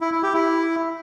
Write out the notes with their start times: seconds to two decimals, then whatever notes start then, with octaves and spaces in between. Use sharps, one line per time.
0.01 E4
0.12 E4
0.23 G4
0.34 E4